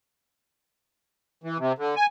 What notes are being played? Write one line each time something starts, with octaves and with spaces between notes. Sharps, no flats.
E3
C3
D3
G#5